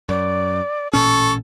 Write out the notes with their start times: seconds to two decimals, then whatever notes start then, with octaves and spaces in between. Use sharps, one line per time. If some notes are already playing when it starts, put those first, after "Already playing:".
0.09 F#2 D5
0.93 A1 A#2 C#4 A4 C#6